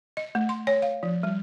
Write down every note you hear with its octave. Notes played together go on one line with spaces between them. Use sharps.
D#5
A3
C6
C#5
F5
F3
G3